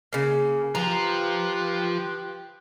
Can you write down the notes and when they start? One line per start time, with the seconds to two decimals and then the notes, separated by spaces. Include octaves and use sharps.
0.13 C#3 A#3
0.75 F3 F4 G4 B4 A#5